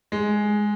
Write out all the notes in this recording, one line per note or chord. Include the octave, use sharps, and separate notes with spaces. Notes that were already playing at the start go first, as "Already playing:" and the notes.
G#3